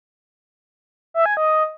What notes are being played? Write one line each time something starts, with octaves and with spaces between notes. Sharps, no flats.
E5
G#5
D#5